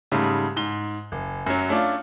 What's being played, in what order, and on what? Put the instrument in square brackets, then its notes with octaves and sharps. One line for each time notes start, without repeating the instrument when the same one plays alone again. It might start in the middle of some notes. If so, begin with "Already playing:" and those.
[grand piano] G#2 C#3 G3 A3
G#2 G7
F#1
F#2 F#3
A3 C#4 D4 F4